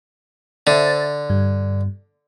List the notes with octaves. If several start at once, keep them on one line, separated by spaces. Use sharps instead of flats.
D3 C5 E5 A6
G2